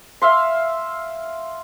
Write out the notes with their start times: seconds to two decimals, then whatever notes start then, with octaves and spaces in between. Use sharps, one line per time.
0.22 E5 F5 C6